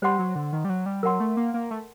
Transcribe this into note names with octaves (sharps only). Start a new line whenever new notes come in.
G3 C5 F#5 C6
F#3
D3
D#3
G3
F#3
G3
F#3 A#4 F#5 C6
A3
A#3
A#3
A3